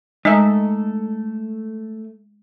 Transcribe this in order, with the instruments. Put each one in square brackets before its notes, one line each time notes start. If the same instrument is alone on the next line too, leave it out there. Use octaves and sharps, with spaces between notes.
[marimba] G#3 [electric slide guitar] A3 A4 [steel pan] D#4 E5